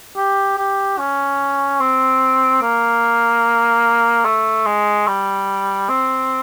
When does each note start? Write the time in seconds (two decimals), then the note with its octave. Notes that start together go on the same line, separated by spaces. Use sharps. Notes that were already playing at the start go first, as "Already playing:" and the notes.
0.16 G4
0.57 G4
0.98 C#4
1.80 C4
2.62 A#3
4.25 A3
4.66 G#3
5.07 G3
5.89 C4